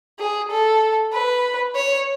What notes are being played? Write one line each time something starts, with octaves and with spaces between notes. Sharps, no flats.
G#4
A4
B4
C#5